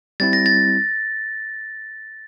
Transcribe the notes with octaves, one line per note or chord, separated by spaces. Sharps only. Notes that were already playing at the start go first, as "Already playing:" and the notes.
G3 C4 E4 A6
A#6
A6